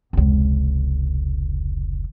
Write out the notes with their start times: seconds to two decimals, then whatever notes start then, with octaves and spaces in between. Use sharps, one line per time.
0.13 F1 C#2